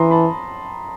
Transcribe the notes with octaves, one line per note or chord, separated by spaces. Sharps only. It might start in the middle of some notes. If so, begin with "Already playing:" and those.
Already playing: E3 A#5 C6 D#6
A5 B5